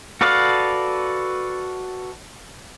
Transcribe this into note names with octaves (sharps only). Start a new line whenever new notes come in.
F#4 A4 B4 D5 F5